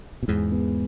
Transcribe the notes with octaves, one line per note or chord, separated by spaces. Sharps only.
B2
E2 G#2 G#3
B3